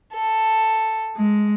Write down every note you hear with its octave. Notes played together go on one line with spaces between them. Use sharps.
A4
G#3